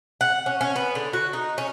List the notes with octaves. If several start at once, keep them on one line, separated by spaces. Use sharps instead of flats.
F#5
C#4
C#4
B3
D3
F#4
D#4
C#4